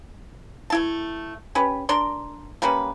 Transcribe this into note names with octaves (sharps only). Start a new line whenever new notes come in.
A3 E4 A5
C#4 G4 B4
D4 A#4 D5 C6
G3 A#3 C#4 B4